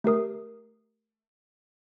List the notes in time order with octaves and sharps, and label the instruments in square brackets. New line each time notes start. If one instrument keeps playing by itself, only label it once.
[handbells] A3 G4 A#4 D#6